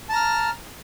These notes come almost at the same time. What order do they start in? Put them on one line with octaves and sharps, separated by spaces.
A5 A#5 F6